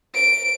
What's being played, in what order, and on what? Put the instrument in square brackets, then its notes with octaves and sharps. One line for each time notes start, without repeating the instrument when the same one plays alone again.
[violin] D7